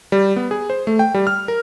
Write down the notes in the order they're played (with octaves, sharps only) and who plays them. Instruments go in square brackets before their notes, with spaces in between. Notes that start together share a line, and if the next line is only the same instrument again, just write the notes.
[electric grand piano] G3
B3
G#4
C5
A3
G5
G3
F6
A#4